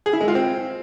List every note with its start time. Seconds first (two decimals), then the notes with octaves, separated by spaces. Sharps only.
0.06 G#4
0.13 E4
0.21 G#3
0.28 F4
0.35 C4